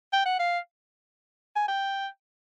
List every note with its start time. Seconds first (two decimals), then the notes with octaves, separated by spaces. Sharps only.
0.13 G5
0.25 F#5
0.39 F5
1.56 G#5
1.68 G5